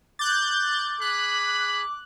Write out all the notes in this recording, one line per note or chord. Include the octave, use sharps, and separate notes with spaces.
D6 F#6 G6 A6
G#4 B5 F#6